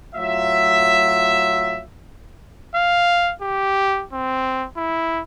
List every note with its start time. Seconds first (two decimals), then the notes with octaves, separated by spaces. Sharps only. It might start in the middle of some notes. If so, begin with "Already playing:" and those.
0.15 A2 F#3 F4 E5
2.75 F5
3.42 G4
4.13 C4
4.77 E4